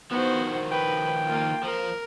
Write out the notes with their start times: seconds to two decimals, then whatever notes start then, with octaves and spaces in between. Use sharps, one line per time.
0.11 D#3 F3 B3 F#4 C5
0.72 B4 G5
1.26 A#3 F4
1.63 F3 A#4